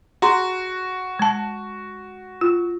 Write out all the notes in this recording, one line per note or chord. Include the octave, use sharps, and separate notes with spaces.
F#4 G#4 A#5 C6
G#3 A5
F4